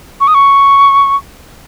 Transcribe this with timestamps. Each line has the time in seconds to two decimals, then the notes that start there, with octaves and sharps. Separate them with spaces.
0.20 C#6
0.27 D#6
0.34 C#6